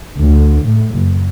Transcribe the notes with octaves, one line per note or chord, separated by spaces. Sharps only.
D2
A2
F#1